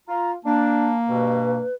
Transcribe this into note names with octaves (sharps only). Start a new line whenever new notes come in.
F4 A#5
A#3 D4 A5
G2 B2 B4